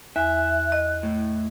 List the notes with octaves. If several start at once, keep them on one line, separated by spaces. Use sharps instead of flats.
E2 E5 G#5 F#6
D#5
A2